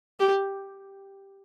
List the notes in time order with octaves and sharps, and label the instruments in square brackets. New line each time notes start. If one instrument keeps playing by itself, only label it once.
[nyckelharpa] G4